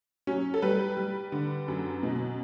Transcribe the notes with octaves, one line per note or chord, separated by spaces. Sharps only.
F#3 C#4
A4
G3 B4
G3
D3
F#2
B2